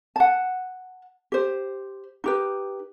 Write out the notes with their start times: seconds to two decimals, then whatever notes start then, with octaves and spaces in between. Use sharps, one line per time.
0.16 F#5 A5
1.32 G4 C5
2.24 D#4 G4 B4